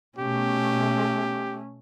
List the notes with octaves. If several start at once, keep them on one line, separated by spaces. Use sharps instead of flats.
B2 A3 C#4 G4